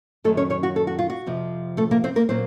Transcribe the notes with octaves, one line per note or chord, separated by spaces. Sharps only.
F#2 D#3 F#3 A3 A4
C#4 C#5
C#4 C#5
F#4
A4
F#4
F4
F#4
F2 C3 F3
A3 A4
A#3 A#4
C4 C5
A#3 A#4
A#2 F#3 A#3 C4 C5